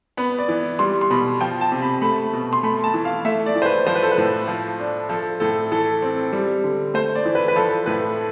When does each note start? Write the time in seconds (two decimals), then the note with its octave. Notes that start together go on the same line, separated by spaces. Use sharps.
0.17 B3 B5
0.38 D5
0.48 E3
0.79 G3 C6
1.01 C6
1.11 B2 B5
1.41 F3 G5
1.61 A5
1.72 C3
1.82 B5
2.02 A3 B5
2.33 B2
2.53 C6
2.63 A3 B5
2.84 A5
2.94 E3
3.05 F5
3.25 A3 E5
3.46 D5
3.55 E3
3.62 C5
3.66 B4
3.86 F3 C5
3.95 B4
4.03 A4
4.12 B4
4.18 A2
4.48 F3
4.80 D4
5.09 F3 A4
5.40 A2 A4
5.72 E3 A4
6.02 C4
6.33 G3
6.64 D3
6.94 A3 C5
7.15 D5
7.25 E3
7.35 B4
7.48 B4
7.56 F3 A4
7.86 A2 B4